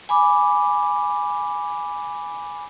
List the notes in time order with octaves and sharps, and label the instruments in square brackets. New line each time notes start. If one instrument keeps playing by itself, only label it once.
[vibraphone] G#5 B5 D6